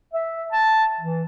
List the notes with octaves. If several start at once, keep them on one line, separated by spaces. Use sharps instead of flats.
E5
A5
E3